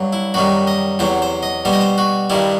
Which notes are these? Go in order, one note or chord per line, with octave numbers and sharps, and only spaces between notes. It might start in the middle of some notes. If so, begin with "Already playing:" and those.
Already playing: G2 F#3
E4
F#2 D#3 G3 F#4
D#5
E2 C3 F#3 C5
C5
D#5
B2 G3 C5
D#5
C5
F#4
G2 D#3 G3 E4